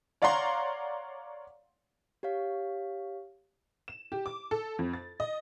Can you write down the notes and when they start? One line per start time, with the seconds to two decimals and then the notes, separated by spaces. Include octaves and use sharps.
0.22 C#5 D5 F5 F#5 A#5 C6
2.23 G4 C#5 F5
3.88 E7
4.12 G4
4.26 D6
4.51 A4
4.79 F2
4.93 A6
5.20 D#5